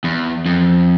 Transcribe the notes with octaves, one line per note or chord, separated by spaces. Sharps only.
E2
F2